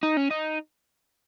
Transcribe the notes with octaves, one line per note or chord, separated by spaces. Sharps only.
D#4
C#4
D#4